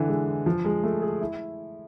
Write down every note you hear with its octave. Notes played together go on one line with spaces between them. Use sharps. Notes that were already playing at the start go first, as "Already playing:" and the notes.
Already playing: D3 E3
G#3
F3
G#3
A3
G#4
E4